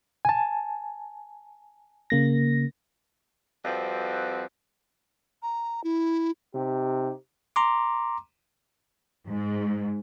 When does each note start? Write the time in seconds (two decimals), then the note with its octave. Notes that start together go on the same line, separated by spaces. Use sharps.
0.25 G#5 A5
2.10 C#3 A#3 A#6
3.65 F2 G3 C4 F#4 B4
5.43 A#5
5.84 E4
6.55 C3 D#4 G4
7.56 A#5 C6 D6
9.27 G#2